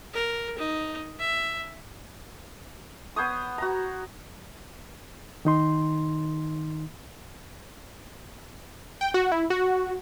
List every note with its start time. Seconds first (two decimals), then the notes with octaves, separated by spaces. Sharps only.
0.14 A#4
0.59 D#4
1.20 E5
3.16 B3 C5 C#5 D#6
3.58 F#4 A#5
5.45 D#3 D#4 C6
9.01 G5
9.14 F#4
9.32 E4
9.50 F#4